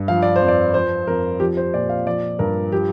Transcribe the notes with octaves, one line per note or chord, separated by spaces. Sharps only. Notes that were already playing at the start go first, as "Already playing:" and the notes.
Already playing: G2
F3 F5
D5
C5
F2
D5
F3 C5
F2 A#4
F3 G4
C5
A#2 D5
F5
F3 D5
G2 A#4
F3 G4